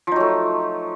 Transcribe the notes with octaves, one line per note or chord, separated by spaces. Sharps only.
F3 F#3 A3 D#4